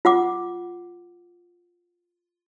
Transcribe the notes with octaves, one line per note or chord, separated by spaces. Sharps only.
F4 F#5 D6